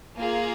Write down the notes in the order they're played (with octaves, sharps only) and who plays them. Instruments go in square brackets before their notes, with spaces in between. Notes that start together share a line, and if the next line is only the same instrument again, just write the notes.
[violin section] A#3 F4 G#4